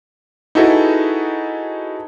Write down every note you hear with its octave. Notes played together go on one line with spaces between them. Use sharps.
D#4 E4 F#4 G#4 A4 B4